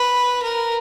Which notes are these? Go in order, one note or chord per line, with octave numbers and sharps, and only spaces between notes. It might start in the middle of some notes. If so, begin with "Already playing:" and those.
Already playing: B4
A#4